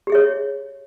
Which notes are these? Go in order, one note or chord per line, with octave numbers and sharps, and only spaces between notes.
G4 G#4 C#5 E5